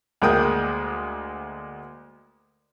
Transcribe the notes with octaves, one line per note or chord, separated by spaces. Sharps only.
D2 G#3 A#3 G5 D#6